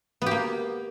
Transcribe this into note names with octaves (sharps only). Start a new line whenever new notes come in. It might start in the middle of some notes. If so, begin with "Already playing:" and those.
A#3 B3 G4